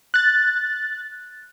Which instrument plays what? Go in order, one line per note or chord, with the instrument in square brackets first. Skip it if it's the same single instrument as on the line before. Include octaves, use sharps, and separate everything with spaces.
[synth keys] F#6 A6